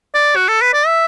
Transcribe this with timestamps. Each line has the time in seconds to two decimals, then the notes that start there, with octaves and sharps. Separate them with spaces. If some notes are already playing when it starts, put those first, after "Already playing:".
0.15 D5
0.36 F#4
0.48 A4
0.62 B4
0.73 D5
0.87 E5